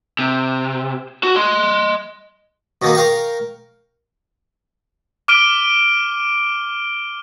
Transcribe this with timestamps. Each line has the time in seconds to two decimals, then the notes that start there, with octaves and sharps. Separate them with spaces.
0.19 C3
1.23 F#4
1.36 D#5 C6
2.82 B2 D#3 A#3
2.95 A#4 F5 G5 C#6
5.28 D6 F6 D7 D#7 G7